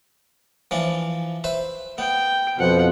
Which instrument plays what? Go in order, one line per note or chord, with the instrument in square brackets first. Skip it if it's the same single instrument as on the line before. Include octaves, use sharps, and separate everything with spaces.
[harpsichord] E3 F3 D4
B4 C5 E5
[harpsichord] B3 [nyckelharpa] G5
[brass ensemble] F2 B2 F3 [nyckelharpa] F#5